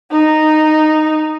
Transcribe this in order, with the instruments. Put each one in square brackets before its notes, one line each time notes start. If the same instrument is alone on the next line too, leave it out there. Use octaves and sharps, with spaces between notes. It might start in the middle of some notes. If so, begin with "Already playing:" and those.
[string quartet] D#4